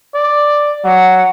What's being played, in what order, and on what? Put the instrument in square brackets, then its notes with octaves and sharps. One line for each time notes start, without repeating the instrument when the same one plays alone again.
[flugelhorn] D5
[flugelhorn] F#3 [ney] F#5